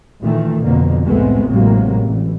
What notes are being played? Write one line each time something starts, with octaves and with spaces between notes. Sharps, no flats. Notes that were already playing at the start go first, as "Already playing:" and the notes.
A#2 D#3 E3 A3
F2 B2 D3 A#3
C2 A2 G#3 A3 B3 C4
A1 A2 C3 F#3 G#3 A#3
A1 E3